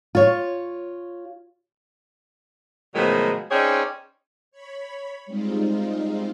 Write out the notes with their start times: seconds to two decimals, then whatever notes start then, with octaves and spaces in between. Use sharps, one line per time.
0.15 F4 C#5
2.95 B2 D#3 F3 F#3 G#3 A3
3.51 C4 C#4 D#4 G#4 C#5 D5
4.51 C#5 B5
5.26 G3 G#3 C4 D#4 F4